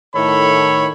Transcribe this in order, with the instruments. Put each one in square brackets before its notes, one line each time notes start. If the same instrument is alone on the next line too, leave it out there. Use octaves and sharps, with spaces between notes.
[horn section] A2 D#3 E4 A4 C#5 B5